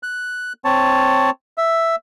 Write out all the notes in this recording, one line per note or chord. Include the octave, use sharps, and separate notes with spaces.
F#6
C4 C#5 A5
E5